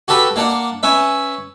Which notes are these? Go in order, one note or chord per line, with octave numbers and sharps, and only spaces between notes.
F#4 G4 A4 B4 B5
A#3 D4 F#5
C#4 B4 E5